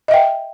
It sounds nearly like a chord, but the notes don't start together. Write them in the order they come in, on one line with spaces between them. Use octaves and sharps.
D#5 E5 G5